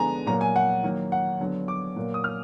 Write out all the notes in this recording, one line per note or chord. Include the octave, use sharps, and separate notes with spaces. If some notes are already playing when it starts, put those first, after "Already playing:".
Already playing: D3 G#3 B3 G#5 A#5
A#2 F#3 A#3 A#5
G#5
F#5
D#3 F#3 A#3
F#5
D3 F#3 B3
D6
A#2 F#3 A#3
D#6
F6